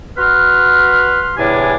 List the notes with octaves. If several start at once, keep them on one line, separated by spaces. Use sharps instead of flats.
F#4 B4 C6 F6
E2 A2 C3 D4 G#5